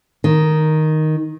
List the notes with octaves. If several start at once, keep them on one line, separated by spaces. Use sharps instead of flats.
D#3